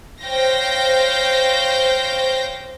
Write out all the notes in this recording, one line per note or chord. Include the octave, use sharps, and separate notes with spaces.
C5 C#5 F5 G5 G6 A#6